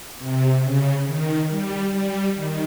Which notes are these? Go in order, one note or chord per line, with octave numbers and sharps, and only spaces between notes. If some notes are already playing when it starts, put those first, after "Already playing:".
C3
C#3
D#3
G3
G3
D#3